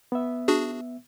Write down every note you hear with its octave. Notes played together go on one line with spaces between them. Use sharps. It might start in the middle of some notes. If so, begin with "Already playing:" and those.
B3 E5
D4 F#4 G#4